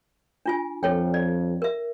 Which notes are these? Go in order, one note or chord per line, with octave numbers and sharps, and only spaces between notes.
D4 F4 G#5
F2 A4 C#5 G5
D5
A#4 E5